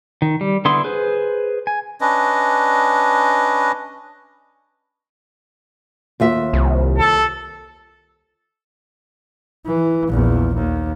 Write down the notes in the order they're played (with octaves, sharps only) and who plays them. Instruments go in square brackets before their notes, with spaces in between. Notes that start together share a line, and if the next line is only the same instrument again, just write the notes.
[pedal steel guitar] D#3
G3
D3 B3 E4 C6 D#6
G#4 B4 C5
G#5
[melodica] C#4 D4 B4 D#5
[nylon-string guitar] D#2 F4 E5
[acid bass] C2
[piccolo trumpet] A4
[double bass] E3
A#1 E2
D#2